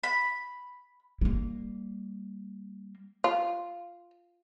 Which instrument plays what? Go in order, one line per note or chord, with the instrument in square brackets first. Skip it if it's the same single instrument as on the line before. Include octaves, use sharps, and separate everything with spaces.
[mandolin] B5
[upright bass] G3 A#3
[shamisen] F4